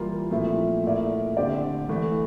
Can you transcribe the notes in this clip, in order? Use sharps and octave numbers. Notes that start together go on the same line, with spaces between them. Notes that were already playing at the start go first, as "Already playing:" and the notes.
Already playing: E3 G3 A#3 F4
A#2 F3 A3 C4 E4
A#2 A3 E4 A#4 D5
D3 A3 C4 G4 D5
E3 A3 E4 A4